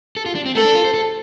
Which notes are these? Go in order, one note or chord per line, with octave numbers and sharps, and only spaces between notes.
A4
F4
D4
C4
A3 A4
D4
F4
C5
A4